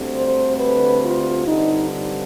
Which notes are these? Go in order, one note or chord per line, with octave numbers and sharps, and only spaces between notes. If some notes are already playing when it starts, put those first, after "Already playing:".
Already playing: D2 D3 G3 C4
C5
B4
F4
G2 D3 G3 C4 D#4